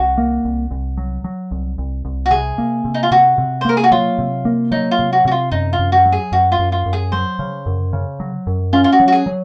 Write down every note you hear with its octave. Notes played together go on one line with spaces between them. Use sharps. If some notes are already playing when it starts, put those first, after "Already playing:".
Already playing: C2 F#4
A#3
C2
C2
F#3
F#3
C2
C2
C2
F#4
C3 G#4
A#3
C3
D#4
F4
C3 F#4
C3
C5
A#3 A#4
G#4
F#4
F#3 F4
C3
A#3
F#3 D#4
F4
C3
F#4
C3 F#4
F4
F#2 D#4
F4
F#2
F#4
F#3
G#4
F#2 F#4
F4
F#2
F4
F#2
G#4
F#3 C5
C#3
F#2
C#3
F#3
F#2
C#4 F4
F4
F#4
F#3
F#4
G#4
F#3